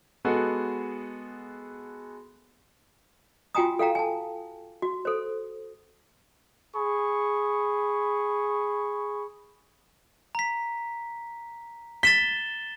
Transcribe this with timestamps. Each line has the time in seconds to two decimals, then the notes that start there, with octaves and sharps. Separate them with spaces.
0.25 G#3 B3 F#4 G#4 A4
3.55 F4 F#4 G5 G#5 A#5 D#6
3.79 A4 F5 G5 A#5
3.95 G#5 A5
4.82 F#4
5.05 A4 C5
6.75 G#4 B5 C#6
10.35 A#5 B6
12.03 A6 B6 E7 G7